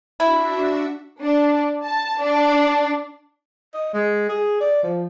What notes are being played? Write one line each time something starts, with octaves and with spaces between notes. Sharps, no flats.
D4 E4 F#4 E5
D4
A5
D4
D#5
G#3
G#4
D5
F3